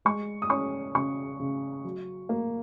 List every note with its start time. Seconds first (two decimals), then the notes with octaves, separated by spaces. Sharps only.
0.05 G#3 C#6
0.42 D#6
0.50 C#4 C#6
0.95 C#3 C#6
1.39 C#3
1.84 F#3
2.29 A#3